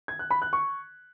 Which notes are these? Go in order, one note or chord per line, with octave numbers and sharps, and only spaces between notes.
G#6
F#6
B5
F#6
C#6